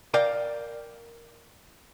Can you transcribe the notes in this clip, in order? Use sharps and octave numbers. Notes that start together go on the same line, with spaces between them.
A#4 D5 F5 G5